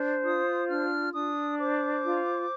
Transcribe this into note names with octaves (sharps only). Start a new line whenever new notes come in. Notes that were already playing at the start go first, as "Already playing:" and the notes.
Already playing: D4 C5
F4 D#6
D4 F6
D4 D#6
C5 D6
F4